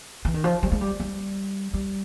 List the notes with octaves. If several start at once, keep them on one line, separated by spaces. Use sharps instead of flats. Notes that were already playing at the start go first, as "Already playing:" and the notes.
E3
D#3
F3
G3
G#3
G3
G3
G3